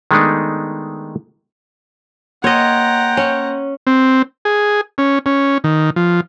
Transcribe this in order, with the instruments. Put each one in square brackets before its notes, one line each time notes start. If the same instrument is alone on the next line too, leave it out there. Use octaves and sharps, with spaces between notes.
[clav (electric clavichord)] D#3 G#3 A3 B3 D4 D#4
[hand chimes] A#3 C6 G#6 [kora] C#5 D#5 [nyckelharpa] F#5 A#5 [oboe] G5
[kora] C#4
[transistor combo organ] C4
G#4
C#4
C#4
D#3
F3